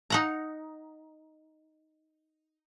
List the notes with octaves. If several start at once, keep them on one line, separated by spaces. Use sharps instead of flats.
D#4 F#5 A#5